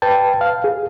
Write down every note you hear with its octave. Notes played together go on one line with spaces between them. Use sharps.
B4 G5 A5
F5
G#4